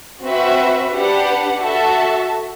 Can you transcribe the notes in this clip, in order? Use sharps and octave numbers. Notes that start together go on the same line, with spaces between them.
C4 F#4 B4 E5
D4 G4 B4 F#5
F#4 A4 E5 A5